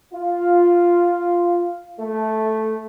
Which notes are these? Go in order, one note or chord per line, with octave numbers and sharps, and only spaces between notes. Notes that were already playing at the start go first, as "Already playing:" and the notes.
F4
A3